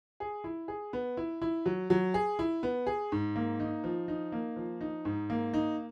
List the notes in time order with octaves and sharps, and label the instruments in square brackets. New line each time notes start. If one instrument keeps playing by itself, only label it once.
[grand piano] G#4
E4
G#4
B3
E4
E4
F#3
F#3
G#4
E4
B3
G#4
G#2
A#3
D#4
F3
D#4
A#3
F3
D#4
G#2
A#3
D#4